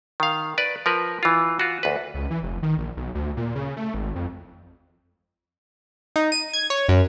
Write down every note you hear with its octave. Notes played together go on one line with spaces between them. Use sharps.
D#3 F5
B4 D5
F3 A#4 B4
E3 F4
F4 F#4
D2 B4
C#2
E3
F1
D#3
A#1
B1
D2
A#2
C#3
A3
G#1
F2
D#4
D#7
G#6
C#5
F#2